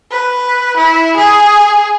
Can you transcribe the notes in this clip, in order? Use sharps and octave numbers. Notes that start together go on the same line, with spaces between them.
B4
E4
G#4